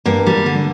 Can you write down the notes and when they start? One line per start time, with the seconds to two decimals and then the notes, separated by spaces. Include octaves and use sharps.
0.05 G2 A#3
0.26 G3
0.46 D3